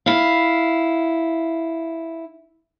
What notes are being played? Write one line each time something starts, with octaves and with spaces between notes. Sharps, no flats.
E4 F5